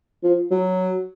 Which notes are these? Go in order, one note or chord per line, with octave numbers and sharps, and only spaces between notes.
F3
F#3